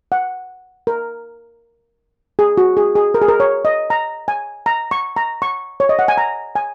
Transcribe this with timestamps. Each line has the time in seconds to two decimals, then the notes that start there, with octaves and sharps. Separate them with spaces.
0.12 F#5
0.87 A#4
2.39 G#4
2.58 F#4
2.77 G#4
2.96 G#4
3.14 A#4
3.22 G#4
3.28 A#4
3.40 C#5
3.65 D#5
3.90 A#5
4.28 G#5
4.66 A#5
4.91 C#6
5.16 A#5
5.42 C#6
5.80 C#5
5.89 D#5
5.99 F#5
6.08 G#5
6.18 A#5
6.55 G#5